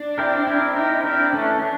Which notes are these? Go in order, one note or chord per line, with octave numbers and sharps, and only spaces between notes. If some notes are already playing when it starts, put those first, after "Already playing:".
Already playing: D4
C4 E4 G4 A#4
C4 E4 G4 A#4
C4 D#4 E4 G4 A#4
C4 D4 E4 G4 A#4
E3 A3 C#4 D4
D4